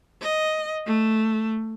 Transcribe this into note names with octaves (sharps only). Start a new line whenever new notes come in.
D#5
A3